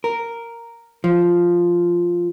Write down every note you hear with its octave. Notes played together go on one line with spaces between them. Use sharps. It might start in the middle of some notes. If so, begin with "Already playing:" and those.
A#4
F3